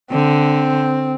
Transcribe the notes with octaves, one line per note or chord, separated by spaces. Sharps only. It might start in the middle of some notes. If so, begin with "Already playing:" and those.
D3 C4